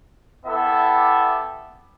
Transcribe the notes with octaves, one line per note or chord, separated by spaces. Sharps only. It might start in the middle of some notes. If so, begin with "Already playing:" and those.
B3 E4 G4 A4 E5